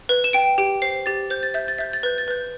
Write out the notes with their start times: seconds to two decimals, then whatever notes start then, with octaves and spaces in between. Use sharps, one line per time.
0.09 B4
0.24 E7
0.33 G5 D7
0.58 G4 D7
0.82 C5 C7
1.06 G4 A6
1.30 C5 G6
1.43 A6
1.54 E5 G6
1.68 A6
1.78 E5 G6
1.93 A6
2.03 B4 G6
2.18 A6
2.28 B4 G6